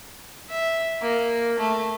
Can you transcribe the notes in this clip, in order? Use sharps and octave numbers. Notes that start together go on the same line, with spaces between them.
E5
A#3
A3